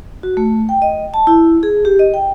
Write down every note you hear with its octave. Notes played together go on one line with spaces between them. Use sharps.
F#4
A3
G5
D#5
A5
E4
G#4
G4
D#5
G5